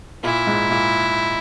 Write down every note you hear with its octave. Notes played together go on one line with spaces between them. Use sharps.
A#2 E4
G#2
A#2